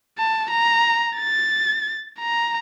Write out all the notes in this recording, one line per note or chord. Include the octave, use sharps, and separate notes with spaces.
A5
A#5
A6
A#5